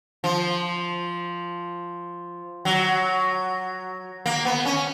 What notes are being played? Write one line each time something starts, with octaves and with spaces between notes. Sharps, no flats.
F3
F#3
A#3
B3
C#4